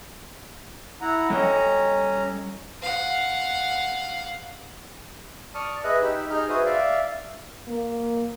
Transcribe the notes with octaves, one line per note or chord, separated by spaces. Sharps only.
E4 F#5 A#5
G3 C#4 A4 D#5 A#5
F5 F#5
D5 A5 C#6 D#6 F6
G#4 B4 D#5 E5 F#6
D#4 G4 B5 E6
D#4 G#4 F6 G6
F#4 G#4 B4 C5 E5 D#6
D5 E5 F5
A#3